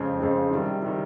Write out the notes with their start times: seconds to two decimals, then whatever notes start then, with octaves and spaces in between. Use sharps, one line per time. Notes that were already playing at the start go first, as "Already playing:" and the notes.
Already playing: F2 C#3 G#3 C4
0.19 F2 C#3 G#3 C4
0.51 C3 D#3 G3
0.82 C3 D#3 G3